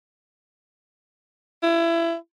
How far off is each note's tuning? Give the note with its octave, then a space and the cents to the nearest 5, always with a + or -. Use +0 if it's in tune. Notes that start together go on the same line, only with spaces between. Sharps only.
E4 +25